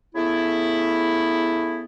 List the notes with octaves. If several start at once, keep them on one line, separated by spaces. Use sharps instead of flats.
C#3 A3 B3 E4